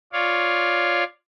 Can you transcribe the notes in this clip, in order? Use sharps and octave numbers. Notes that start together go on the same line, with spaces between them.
F4 C#5 D5 F5